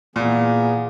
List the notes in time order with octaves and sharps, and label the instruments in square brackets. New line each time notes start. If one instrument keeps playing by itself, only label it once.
[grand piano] A#2 [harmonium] E3 B3 G#4